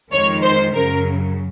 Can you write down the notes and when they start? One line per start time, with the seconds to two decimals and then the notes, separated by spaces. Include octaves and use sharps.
0.12 F2 D#3 G#3 C#5
0.43 C5
0.74 F#2 C#3 F#3 A#4